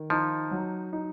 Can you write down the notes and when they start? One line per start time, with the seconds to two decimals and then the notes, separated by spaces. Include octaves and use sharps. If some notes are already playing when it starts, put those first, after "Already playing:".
Already playing: D#3
0.10 F3 D#4
0.51 F#3
0.93 D#4